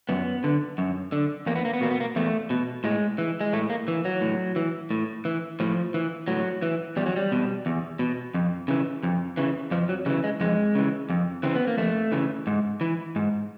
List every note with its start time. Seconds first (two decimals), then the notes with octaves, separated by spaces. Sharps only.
0.09 F#2 B3
0.44 D3
0.78 F#2
1.12 D3
1.46 E2 A#3
1.55 B3
1.65 A#3
1.73 B3
1.81 B2 A#3
1.91 B3
2.00 A#3
2.16 E2 A3
2.50 B2
2.84 A2 G#3
3.18 E3
3.41 G#3
3.53 A2 A3
3.70 A#3
3.88 E3
4.05 F#3
4.21 A2
4.56 E3
4.91 A2
5.25 E3
5.60 A2 F3
5.94 E3
6.28 A2 F#3
6.62 E3
6.97 E2 G3
7.06 F#3
7.16 G3
7.32 B2
7.66 E2
7.99 B2
8.34 F2
8.68 C#3 E3
9.03 F2
9.37 C#3 E3
9.71 F2 F3
9.89 F#3
10.06 C#3 G3
10.09 E3
10.24 G#3
10.41 F2 G#3
10.75 C#3 E3
11.10 F2
11.43 C#3 E3 C4
11.55 B3
11.67 A#3
11.77 F2 A3
12.12 C#3 E3
12.47 G#2
12.81 E3
13.16 G#2